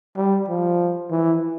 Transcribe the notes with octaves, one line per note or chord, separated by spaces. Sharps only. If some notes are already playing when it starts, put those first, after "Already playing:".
G3
F3
E3